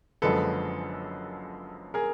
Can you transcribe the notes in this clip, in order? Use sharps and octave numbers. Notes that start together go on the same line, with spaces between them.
F#1 F#2 D3 F3 G#3 A4 B4
G#4 A#4